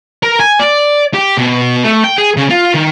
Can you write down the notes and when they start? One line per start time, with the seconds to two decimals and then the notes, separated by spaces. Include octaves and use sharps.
0.23 A#4
0.40 G#5
0.59 D5
1.14 G4
1.37 B2
1.84 A3
2.04 G5
2.18 G#4
2.37 C#3
2.50 F4
2.74 D#3